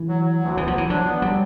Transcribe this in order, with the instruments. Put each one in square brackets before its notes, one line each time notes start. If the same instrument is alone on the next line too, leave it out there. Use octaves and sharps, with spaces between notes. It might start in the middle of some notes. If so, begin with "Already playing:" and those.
Already playing: [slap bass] E3
[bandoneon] F#3
F#3
D2
[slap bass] E3 [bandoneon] B3
[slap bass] F3
[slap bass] E3 [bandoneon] F#3
[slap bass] F3 [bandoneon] D4
[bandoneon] B3
[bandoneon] F#3 [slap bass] G3